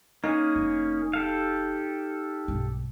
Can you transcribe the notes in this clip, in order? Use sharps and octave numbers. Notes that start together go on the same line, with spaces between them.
A#3 C#4 D#4 G#4
F1
G4 A4 F5
B1 G2